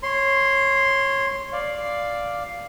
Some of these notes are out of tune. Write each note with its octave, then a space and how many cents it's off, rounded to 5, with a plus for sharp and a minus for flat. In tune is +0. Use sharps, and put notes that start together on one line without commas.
C#5 -20 C6 +0
D5 +0 F5 +0